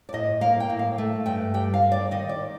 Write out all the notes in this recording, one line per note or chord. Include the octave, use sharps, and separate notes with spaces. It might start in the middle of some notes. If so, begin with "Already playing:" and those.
D5
A2 D#5
A#3 F5
G5
A2
F5
A3
G2 G5
G3 G5
F5
A#3
D5
D#3 D#5
D5